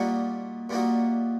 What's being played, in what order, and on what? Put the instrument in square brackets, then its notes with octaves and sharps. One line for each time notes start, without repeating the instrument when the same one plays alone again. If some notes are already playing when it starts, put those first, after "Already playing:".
Already playing: [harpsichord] A#2 G3 A#3 D#4 F#4
A#2 G3 A#3 D#4 F#4